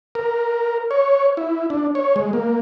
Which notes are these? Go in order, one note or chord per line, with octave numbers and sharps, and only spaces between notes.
A#4
C#5
E4
D4
C#5
G#3
A#3